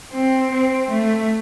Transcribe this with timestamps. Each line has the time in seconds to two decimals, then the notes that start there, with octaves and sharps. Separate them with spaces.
0.12 C4
0.51 C4
0.90 A3